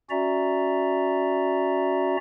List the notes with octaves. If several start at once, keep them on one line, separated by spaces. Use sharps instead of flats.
C#4 F#4 D5 E5 A#5